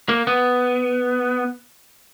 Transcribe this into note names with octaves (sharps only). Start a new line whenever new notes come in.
A#3
B3